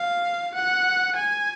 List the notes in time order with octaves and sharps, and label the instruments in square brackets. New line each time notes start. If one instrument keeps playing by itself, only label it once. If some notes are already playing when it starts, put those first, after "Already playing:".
Already playing: [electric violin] F5
F#5
G#5